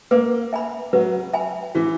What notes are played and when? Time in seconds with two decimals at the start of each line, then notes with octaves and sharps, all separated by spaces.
0.11 A#3 B4
0.53 E5 G#5 B5
0.93 F#3 B4
1.33 E5 G#5 B5
1.75 E3 F#4